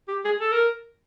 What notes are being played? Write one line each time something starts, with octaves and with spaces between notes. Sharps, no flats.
G4
G#4
A4
A#4